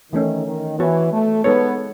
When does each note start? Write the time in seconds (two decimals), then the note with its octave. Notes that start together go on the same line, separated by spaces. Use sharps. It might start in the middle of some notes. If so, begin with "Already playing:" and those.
0.12 D#3 E3 A3 C#4
0.46 D#3
0.79 E3 B3 F#4 C#5
1.12 A3
1.44 G#3 B3 D#4 A4 C#5